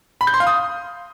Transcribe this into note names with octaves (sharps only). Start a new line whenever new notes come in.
B5
G6
C6
F5
D#6